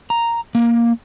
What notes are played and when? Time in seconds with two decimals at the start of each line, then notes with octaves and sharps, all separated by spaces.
0.10 A#5
0.55 A#3